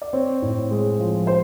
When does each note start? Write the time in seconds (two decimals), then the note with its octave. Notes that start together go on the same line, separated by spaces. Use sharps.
0.02 D5
0.13 C4 C#5
0.42 A2
0.71 G#3
0.99 F3
1.27 C5